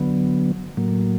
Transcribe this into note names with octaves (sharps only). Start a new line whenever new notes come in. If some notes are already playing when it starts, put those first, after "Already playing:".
Already playing: D3 F#3 B3
A2 F#3 A#3